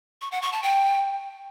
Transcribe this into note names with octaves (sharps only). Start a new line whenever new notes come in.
C#6
F#5
C#6
A5
G5